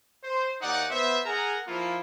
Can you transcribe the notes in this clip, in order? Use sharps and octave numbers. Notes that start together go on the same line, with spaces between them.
C5
D#2 D#4 D5 F#5
B3 C5 E5
G#4 A#4 F#5 G#5 A#5
F3 A#3 E4 F4